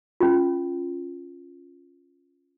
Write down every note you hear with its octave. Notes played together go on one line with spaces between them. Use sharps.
C#4 F4